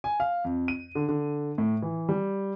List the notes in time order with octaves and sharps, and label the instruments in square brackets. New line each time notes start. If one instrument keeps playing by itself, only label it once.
[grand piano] G#5
F5
F2
D#7
D3
D3
A2
E3
G3